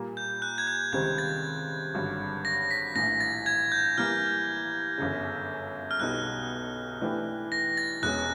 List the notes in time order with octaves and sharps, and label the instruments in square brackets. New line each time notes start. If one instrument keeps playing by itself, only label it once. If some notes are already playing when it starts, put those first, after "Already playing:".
Already playing: [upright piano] A#2 G3 A#3
[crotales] G6
F#6
G#6
G6
[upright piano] C#2 C3 D#3 G3 C4 [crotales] G#6
[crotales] A6
[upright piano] G#1 G2 D3 F#3
[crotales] A#6
B6
[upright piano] A#1 A2 E3 [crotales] A#6
[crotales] A6
G#6
G6
[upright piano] E3 G3 A#3 [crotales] F6
[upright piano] G1 F#2 C#3
[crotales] F6
[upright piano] B1 B2 G3 B3 D#4 [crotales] F#6
[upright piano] E3 A3 D4 G4 B4
[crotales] A#6
A6
[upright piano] E1 E2 B2 G#3 C#4 [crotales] F#6